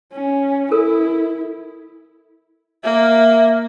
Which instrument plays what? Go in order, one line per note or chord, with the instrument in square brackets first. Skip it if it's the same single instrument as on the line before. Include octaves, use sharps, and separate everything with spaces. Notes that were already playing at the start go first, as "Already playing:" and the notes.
[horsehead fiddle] C#4
[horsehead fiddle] E4 [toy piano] A4 A#4
[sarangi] A#3 [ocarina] E5